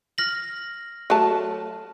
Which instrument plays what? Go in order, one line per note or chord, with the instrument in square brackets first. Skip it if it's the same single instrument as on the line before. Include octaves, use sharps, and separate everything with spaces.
[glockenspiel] F6 A#6 F#7
[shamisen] F#3 A3 A5